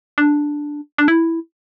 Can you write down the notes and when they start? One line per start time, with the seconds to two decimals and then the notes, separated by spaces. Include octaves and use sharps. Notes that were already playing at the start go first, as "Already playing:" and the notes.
0.18 D4
0.98 D4
1.08 E4